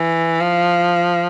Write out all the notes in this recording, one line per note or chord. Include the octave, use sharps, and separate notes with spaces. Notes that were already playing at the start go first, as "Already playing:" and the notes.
Already playing: E3
F3